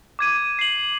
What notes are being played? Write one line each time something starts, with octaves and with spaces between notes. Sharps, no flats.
D6 G#6 D#7
C7 F#7